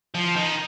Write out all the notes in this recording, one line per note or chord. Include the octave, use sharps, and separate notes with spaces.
F3
D#3